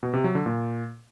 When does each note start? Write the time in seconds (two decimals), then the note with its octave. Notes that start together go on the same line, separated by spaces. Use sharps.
0.03 B2
0.13 C3
0.24 F#3
0.35 D3
0.46 A#2